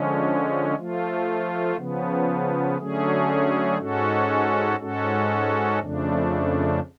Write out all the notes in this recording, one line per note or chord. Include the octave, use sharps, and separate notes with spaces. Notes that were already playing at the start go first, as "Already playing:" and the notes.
Already playing: D3 F3 G#3 C#4
F3 A3 F4
C#3 F3 B3
D3 F#3 A3 C#4 G#4
G#2 G#3 C#4 F#4 A4
G#2 G#3 C#4 F#4 A4
F2 C#3 F3 A3 D4